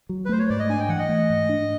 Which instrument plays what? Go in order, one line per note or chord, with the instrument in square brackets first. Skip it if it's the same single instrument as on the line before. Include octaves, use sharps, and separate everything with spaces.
[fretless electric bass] F#3
[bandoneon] B4
[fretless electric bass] A3 [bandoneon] C5
[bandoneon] C#5
[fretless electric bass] G#2 [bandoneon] D5
[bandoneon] D#5
[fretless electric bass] D4 [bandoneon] G#5
[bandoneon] G5
[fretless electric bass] E3 [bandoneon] F#5
[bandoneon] D#5
[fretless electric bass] A3
G#2
D4